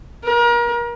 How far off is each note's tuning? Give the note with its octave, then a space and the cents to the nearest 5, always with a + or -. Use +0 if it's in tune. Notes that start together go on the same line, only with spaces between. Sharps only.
A#4 +35